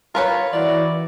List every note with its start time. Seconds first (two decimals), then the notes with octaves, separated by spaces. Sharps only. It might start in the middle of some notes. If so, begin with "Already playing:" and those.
0.15 F4 A#4 B4 C#5
0.53 E3 E4 F#4 D5